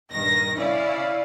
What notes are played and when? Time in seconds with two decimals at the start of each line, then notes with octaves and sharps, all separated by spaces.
0.11 A#1 G2 D#3 A#6
0.56 C#4 E4 D5 F5